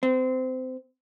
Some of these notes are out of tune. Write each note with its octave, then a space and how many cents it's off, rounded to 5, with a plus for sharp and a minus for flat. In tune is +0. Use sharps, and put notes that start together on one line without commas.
C4 -25